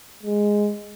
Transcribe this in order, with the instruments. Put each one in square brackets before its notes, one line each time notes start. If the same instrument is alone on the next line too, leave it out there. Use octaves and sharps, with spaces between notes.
[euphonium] G#3